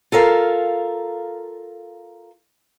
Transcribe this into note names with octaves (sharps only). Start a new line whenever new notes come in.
F4 A4 A#4 F5